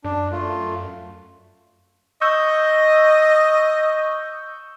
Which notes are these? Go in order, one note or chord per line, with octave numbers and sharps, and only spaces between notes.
F#2 D4
A3 F4
D#5 C#6 E6 G6